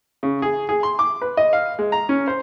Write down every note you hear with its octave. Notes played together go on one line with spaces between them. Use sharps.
C#3
G#4
G#4
C6
D6
B4
D#5
F5
G#3
A#5
C#4
C5